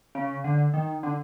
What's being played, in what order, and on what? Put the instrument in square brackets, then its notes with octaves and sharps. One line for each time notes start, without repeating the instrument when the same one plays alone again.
[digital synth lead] C#3
D3
D#3
D3